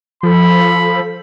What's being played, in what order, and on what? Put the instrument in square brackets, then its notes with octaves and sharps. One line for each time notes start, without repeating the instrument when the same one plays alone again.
[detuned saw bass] F3 [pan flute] A4 [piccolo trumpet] B5